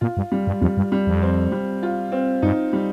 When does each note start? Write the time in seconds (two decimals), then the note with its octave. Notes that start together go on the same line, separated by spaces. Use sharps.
0.01 A#2 F4
0.17 G2
0.32 G3
0.47 G2
0.61 F2 G3
0.77 G2
0.92 G3
1.07 F2
1.22 C4
1.52 G3
1.83 F4
2.12 C4
2.42 G2 D#4
2.73 G3